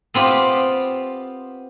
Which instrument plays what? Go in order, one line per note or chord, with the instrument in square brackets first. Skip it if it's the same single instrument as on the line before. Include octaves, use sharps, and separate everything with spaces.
[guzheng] B3 C4 F4 G4